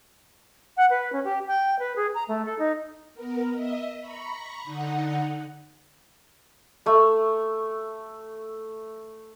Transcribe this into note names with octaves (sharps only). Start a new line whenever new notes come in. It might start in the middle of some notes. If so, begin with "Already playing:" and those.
F#5
B4
C#4
G4
G5
B4
G#4
A#5
A3
A4
D#4
B3 A#4
D#5 E5
A#5 B5 C#6
D3 D#4 F#5
A3 E5